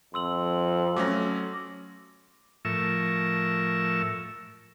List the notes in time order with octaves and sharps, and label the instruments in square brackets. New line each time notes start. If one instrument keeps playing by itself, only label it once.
[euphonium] F2 [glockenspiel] C6 E6 F#7
[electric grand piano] F#3 A3 C#4 [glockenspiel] D6 D#6 A#6
[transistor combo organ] A2 F3 A#4 E5 C#6 E6